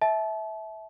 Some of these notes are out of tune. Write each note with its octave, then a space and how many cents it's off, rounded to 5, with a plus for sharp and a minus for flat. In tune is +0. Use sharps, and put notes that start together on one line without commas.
E5 -15 A5 -30